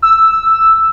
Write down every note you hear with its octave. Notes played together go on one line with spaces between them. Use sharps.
E6